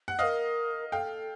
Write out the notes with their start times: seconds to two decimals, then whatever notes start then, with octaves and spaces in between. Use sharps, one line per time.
0.08 F#5
0.19 C5 D#5 F5
0.23 A#4
0.92 A4 F5 G5